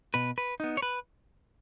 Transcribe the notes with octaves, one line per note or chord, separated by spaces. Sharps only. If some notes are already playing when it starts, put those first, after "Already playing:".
B2 B4
B4
B3 D#4
C#5
B4